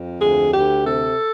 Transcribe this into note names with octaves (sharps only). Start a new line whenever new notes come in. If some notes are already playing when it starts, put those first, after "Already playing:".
Already playing: F2
D2 G#4
D2 G4
C3 A4